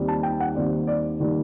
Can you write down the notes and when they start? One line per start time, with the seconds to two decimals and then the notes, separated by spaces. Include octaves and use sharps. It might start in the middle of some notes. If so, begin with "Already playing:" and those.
Already playing: D#2 D#3 G3 C4
0.08 A5
0.23 G5
0.40 F#5
0.55 D#2 D#3 G3 C4 D5
0.87 D5
1.20 D#3 G3 A#3